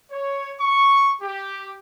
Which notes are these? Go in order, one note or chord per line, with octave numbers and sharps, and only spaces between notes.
C#5
C#6
G4